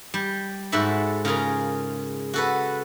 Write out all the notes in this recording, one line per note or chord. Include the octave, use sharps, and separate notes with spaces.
G3
G#2 F#4 A4 E5 B5
C#3 F4 G#4 A#4
F#4 A4 B4